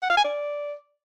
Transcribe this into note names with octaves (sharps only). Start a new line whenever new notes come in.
F#5
F5
G#5
D5